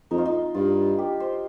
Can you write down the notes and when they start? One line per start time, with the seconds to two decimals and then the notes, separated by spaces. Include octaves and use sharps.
0.11 F2 D#4
0.18 F4
0.26 D#4
0.54 G2 F4
0.98 G4
1.20 C5